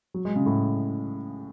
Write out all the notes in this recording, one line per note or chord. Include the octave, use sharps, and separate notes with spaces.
F#3
G#3
C#3
A2